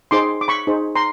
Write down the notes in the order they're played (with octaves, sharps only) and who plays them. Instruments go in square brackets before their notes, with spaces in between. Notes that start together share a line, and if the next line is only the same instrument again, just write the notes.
[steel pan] D#4 G#4 C5 C6 D6
D6
B5 C#6
D#4 G#4 C5
A#5 C6